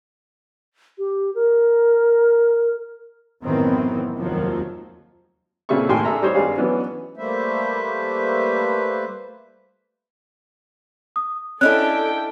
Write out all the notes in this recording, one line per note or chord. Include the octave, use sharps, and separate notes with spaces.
G4
A#4
A1 F#2 D#3 E3 B3 C4
F1 D#2 D#3 F3 F#3
A#2 C#3 C4 E4 A4 C#6
D#2 A2 G3 G5 G#5 C6
D4 G#4 A4 E5 A#5
G3 D#4 C5 C#5
G#1 G2 G3 G#4 F5
E3 F#3 B3 C#4 D4
G3 A3 A#3 B4 C5 E5
D#6
C#4 D4 E4 A4 D#5 G5 F#6